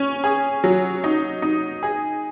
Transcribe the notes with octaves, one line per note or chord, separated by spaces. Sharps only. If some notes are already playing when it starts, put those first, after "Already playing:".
Already playing: C#4
G#4
F#3
D#4
D#4
G#4